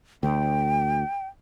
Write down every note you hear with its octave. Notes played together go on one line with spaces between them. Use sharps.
D2 G5